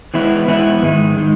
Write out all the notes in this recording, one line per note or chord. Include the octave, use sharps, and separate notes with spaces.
E3 G#3 B3 E4
E3 G#3 B3 E4
G#2 D#3 G#3 D#4
D#3 G#3 D#4